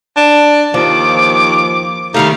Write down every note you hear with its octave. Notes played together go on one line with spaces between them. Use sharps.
D4
D#2 F3 D6
D#3 G3 A3 D#4 F5